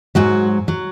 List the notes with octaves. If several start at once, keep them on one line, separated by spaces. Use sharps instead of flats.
G#2 F#3 F#4
F#3